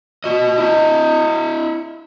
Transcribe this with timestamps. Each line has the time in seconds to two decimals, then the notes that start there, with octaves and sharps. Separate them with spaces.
0.24 F#4 D#5
0.58 E4 D#5